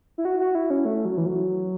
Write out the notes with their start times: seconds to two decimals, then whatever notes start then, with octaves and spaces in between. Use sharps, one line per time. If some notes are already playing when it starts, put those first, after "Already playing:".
0.18 E4
0.25 F#4
0.40 F#4
0.55 E4
0.70 C#4
0.85 A3
1.05 F#3
1.17 E3
1.26 F#3